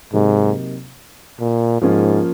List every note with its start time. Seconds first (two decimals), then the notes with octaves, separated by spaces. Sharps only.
0.13 G#2 C3 F#3 A#3 D#4
1.40 A#2
1.82 G#2 F3 A#3 C#4 F4